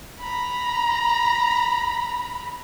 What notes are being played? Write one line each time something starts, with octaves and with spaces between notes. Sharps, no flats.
A#5 B5